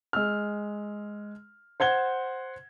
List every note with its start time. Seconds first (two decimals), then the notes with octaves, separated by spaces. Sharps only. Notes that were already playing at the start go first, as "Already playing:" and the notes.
0.13 G#3 E6 F6
1.80 C5 F#5 G#6 G7